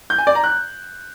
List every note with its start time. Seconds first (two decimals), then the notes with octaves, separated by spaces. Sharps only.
0.10 G6
0.18 G#5
0.27 D5
0.35 A#5
0.44 F#6